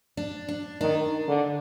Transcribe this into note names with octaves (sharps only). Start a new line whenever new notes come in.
D4
D4
D#3 D4
D3